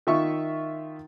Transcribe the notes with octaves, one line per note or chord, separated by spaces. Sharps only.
D#3 F4 E5 C#6